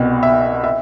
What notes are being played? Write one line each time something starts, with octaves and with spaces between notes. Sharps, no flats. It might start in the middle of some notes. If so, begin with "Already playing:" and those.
Already playing: C2 B2
E5
E5